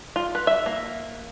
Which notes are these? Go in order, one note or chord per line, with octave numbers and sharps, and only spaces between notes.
F4
B4
E5
A#3